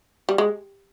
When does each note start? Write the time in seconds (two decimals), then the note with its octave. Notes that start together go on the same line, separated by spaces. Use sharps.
0.29 G3
0.38 G#3